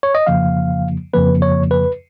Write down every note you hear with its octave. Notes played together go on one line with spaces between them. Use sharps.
C#5
D#5
F2 C#3 F3 A#3 F5
F2 C#3 F3 A#3 B4
C#5
B4